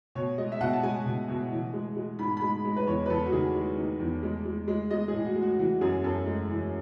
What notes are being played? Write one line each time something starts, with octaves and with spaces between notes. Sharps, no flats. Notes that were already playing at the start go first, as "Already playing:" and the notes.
B2 C#5
G#3 D#5
E5
B2 F#5
A5
G#3 G#5
B2
B2
E3
G#3
G#3
G#2 B5
G#3 B5
G#3
B4
E2 C#5
B4
E2 A4
F#4
D#3 G#4
G#3
D#3
E2
G#3
G#3
G#3
G#3 D#5
G#4
A2
F#4
G#3
F#4
E3 F#4
F#2 G#4
F#2 A4
G#3
E3